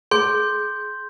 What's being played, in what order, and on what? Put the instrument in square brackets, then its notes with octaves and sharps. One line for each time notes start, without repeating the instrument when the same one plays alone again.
[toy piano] G#4 [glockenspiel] C6 G6